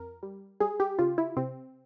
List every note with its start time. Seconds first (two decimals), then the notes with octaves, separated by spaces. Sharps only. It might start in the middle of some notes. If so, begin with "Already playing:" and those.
Already playing: F2 A#4
0.23 G3
0.60 G3 G#4
0.80 G4
0.99 C#3 F4
1.18 E4
1.37 C3 C4